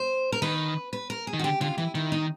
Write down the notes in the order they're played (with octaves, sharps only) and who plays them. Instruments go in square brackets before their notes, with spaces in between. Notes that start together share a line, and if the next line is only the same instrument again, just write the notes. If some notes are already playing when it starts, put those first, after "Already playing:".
Already playing: [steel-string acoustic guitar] C5
A#4
[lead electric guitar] D#3 [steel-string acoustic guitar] B4
[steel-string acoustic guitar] B4
A#4
G#4
[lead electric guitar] D#3
[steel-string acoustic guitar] F#4
[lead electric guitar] D3 [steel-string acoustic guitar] G4
[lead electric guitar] D3 [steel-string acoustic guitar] F4
[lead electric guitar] E3 [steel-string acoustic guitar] E4
[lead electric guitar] D#3 [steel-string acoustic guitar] E4
[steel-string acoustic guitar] D#4